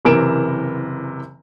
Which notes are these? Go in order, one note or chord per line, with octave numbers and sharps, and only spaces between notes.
F#1 C3 E3 A#4 D7 E7